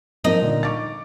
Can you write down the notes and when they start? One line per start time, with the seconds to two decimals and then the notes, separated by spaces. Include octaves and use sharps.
0.24 F3 A#3 C4 D#4
0.42 A#2 D3
0.63 C#6 D6 A6